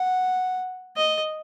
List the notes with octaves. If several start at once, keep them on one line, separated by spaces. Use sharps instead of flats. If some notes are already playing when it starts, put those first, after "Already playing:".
Already playing: F#5
D#5